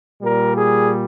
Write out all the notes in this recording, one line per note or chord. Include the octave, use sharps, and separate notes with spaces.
A#2 G3 A#4
G#4